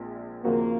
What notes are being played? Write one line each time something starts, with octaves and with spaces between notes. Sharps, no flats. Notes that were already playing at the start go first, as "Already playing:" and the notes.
Already playing: A#1 A#2 G#3 C4
D#2 C#3 F3 A#3 C4 F#4